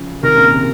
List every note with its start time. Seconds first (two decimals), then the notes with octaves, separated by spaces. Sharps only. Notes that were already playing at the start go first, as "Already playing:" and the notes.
Already playing: C#3 F3
0.23 C3 D#3 A#4
0.37 A#2 C#3
0.50 C3